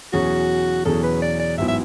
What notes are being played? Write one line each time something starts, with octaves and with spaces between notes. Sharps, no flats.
E2 B2 F#3 C#4 F#4 G#4
E2 B2 F#3 C#4 G#4 A4
B4
D5
D5
A1 G#2 F#3 B3 E4 E5
E5